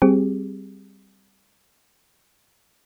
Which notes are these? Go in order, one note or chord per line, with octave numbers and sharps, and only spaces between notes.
G3 C4 G4 G#4